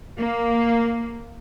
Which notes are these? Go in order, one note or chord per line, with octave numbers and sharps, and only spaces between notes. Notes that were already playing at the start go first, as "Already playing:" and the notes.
A#3